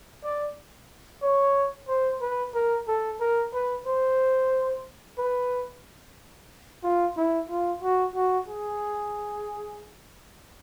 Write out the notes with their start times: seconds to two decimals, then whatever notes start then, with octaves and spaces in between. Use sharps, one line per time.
0.24 D5
1.22 C#5
1.88 C5
2.21 B4
2.54 A#4
2.88 A4
3.20 A#4
3.54 B4
3.86 C5
5.18 B4
6.83 F4
7.17 E4
7.50 F4
7.82 F#4
8.15 F#4
8.48 G#4